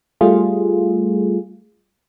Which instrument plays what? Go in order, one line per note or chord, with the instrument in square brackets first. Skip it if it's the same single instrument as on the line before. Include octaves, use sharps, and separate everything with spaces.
[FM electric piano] G3 A3 F4 G#4